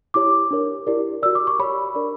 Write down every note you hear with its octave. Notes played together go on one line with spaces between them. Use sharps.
E4 G4 C#5 D6
D4 A#4 C#5
E4 G4 A#4 D5
F#4 A#4 D5 E6
D6
C#6
G4 C#5 B5
D4 A#4 D5